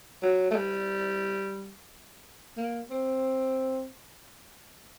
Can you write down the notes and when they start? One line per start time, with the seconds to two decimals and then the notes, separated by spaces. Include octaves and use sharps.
0.22 F#3
0.51 A3
0.56 G3
2.57 A#3
2.90 C4